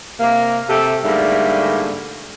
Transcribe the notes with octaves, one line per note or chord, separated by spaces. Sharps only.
C3 A#3
C3 A3 G4 A4
G#2 D3 G3 A3 A#3